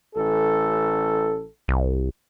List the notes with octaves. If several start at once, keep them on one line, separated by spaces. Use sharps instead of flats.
A1 A4
C2